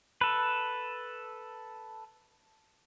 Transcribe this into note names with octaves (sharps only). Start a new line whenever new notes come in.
A4 B4